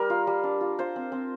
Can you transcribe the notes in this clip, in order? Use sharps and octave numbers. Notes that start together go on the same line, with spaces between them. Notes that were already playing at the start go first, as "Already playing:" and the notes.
Already playing: G3 A#4
F4
G3
D4
F4
F4 C5
C4
C4